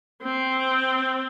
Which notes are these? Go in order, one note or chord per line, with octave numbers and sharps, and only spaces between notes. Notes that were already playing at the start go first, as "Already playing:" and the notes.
C4